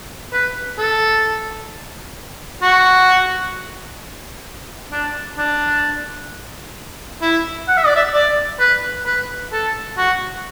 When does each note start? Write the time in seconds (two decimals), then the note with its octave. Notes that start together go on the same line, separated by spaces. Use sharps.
0.32 B4
0.78 A4
2.62 F#4
4.92 D4
5.38 D4
7.22 E4
7.68 F#5
7.77 E5
7.86 D5
7.96 E5
8.13 D5
8.60 B4
9.06 B4
9.52 A4
9.97 F#4